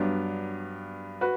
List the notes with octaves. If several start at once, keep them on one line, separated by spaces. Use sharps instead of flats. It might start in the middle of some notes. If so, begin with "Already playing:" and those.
Already playing: G2 F#3 B3 D4
F#4 B4